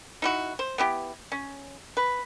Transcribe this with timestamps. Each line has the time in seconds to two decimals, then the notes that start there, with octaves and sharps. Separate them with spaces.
0.22 D#4 E4 F#4
0.59 C5
0.78 B3 E4 G4
1.32 C#4
1.97 B4